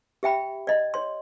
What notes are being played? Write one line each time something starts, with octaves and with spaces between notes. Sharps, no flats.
G4 E5 G5 B5
D5 D#5
C#5 C6